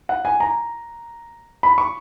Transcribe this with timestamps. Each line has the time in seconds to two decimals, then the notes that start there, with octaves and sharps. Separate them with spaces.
0.09 F#5
0.25 G#5
0.40 A#5
1.63 B5
1.78 C#6